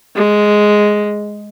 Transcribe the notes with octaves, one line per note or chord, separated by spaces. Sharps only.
G#3